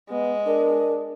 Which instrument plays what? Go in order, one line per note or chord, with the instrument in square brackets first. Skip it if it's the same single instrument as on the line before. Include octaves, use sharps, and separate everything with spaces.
[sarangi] G#3 [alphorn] B3
[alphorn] D4 [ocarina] A#4